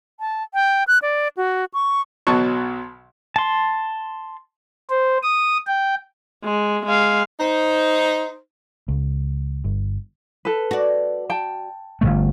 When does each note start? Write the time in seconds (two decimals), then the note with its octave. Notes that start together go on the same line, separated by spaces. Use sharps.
0.20 A5
0.54 G5
0.88 F#6
1.02 D5
1.37 F#4
1.74 C#6
2.27 B1 B2 F#3 A5 C#6
3.36 A5 C6
4.90 C5
5.23 D#6
5.67 G5
6.44 G#3
6.86 G#3 F5
7.39 D#4 C5
8.88 C#2
9.64 G1
10.45 A4 B4
10.71 F#4 D5
11.30 G5 A5
12.01 G1 F2 A3